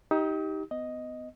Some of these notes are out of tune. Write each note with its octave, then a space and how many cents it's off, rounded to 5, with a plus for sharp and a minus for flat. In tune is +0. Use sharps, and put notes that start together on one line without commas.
D#4 +20 G4 +0 D#6 +45
B3 +30 D#5 +0